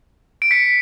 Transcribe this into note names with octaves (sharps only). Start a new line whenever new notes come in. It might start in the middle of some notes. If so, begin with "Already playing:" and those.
D7
B6 C#7